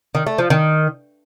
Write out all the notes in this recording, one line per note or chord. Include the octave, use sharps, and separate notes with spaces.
D#3
A3
F3
D#3